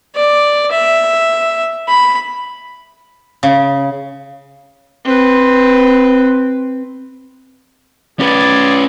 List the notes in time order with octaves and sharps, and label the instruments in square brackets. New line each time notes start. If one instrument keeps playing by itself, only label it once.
[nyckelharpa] D5
E5
B5
[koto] C#3
[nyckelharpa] C4 B4
[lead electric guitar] C#4 B4 [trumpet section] G#4 D5